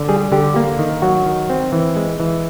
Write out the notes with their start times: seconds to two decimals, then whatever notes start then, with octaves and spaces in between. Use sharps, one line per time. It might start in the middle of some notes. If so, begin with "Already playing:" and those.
Already playing: D3
0.09 G3 G#4
0.32 D3 G4
0.56 A#3
0.79 D#3
1.02 F#3 F#4
1.26 D#3
1.50 C4
1.72 E3
1.96 G#3
2.20 E3